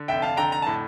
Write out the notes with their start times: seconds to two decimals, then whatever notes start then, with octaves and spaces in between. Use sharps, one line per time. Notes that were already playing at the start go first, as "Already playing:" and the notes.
Already playing: D3
0.08 F1 E5 G5
0.22 F5 A5
0.37 D3 G5 A#5
0.52 A#5
0.62 A2 A5